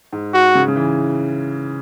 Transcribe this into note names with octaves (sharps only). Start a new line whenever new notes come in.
G#2
F#4
C#3
C#3
E3